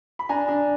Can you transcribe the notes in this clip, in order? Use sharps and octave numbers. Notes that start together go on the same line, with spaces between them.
B5
D4 G#5 A#5
D4